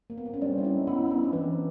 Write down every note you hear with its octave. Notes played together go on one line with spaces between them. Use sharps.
A#3
B3
C4
C#4
G3 C4 D4
E4
C#4 D#4
B3 C#4 D#4 E4
C#4
C4 D4
D#4
E3 C4 D4